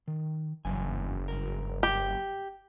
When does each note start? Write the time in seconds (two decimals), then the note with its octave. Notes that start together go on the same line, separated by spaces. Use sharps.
0.08 D#3
0.65 F#1 E2 G2 G#5
1.28 G2 A#4
1.83 G4